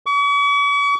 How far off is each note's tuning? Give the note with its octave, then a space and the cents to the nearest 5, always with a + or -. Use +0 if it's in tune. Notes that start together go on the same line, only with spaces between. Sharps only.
C#6 +45